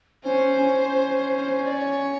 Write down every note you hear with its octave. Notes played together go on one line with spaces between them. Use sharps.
C#4 C5
C#4
D5
C#5